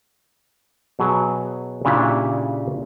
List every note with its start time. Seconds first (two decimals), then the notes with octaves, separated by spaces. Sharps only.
0.99 B2 F#3 G#4 B4
1.85 A#2 C#3 D4 E4 G4